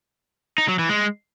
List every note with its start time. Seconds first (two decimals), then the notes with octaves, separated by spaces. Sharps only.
0.58 D#4
0.68 F#3
0.79 E3
0.89 G#3